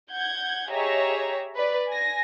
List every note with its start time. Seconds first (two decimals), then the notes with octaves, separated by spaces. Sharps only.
0.10 F#5 G6 G#6
0.69 G4 G#4 C#5 D#5 E5 A#5
1.56 B4 D5
1.89 G#5 A#6